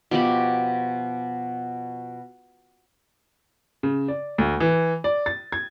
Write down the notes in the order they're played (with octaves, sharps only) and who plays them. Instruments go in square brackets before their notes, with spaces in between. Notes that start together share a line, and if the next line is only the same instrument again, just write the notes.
[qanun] B2 F3 G4 B5
[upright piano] C#3
D5
D2
E3
D5
A6
G#6